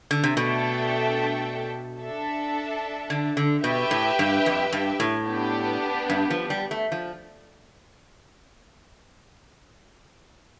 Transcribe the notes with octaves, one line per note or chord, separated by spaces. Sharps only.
D3
C3
B2 A3 D4 A4 E5 G5
D4 A4 E5
D3
D3
B2 G4 B4 E5 G5
A2
G2
F2
G2
A2
B3 D4 G4
G2
F3
G3
A3
F3